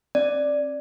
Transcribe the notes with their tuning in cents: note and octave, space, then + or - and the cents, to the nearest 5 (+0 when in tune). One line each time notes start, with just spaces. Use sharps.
C4 +45 D5 +0